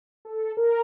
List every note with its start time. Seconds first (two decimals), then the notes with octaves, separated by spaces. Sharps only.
0.25 A4
0.57 A#4